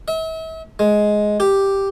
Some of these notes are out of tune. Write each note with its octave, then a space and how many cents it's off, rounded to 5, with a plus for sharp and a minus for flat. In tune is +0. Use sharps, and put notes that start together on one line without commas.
E5 -40
G#3 +10
G4 +0